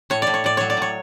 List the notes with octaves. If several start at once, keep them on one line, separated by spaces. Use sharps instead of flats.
A2 C#5
A2 D5
C#5
A2 D5
F#3 C#5
D5
A2 C#5